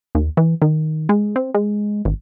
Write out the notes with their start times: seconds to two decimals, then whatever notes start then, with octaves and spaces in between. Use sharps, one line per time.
0.15 D#2
0.37 E3
0.62 D#3
1.09 G#3
1.36 C4
1.54 G#3
2.05 G#1